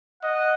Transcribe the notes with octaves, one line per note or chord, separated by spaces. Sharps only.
D#5 F#5